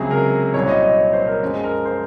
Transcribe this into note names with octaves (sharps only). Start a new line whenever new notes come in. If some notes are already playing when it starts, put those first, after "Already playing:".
Already playing: C#2 C3 F#3 G#4
A#4
C2 A#2 F#3 C#5
D#5
D#5
C#5
C5
A#4
F#2 F3 G#3
A#4
C5